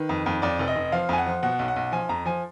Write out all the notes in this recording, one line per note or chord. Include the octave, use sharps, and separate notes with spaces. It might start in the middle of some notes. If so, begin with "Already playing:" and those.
Already playing: D#3 B4
F2
F2
F2 D5
F1
D#5
F1
F3 F5
F2 G#5
F#5
F3
B2 F#5
B1
F#5
B1
F3 G#5
F2 A#5
F3 G#5